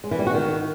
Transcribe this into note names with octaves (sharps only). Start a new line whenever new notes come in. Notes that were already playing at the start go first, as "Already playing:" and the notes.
G#3
E3
G3
F#4
D#3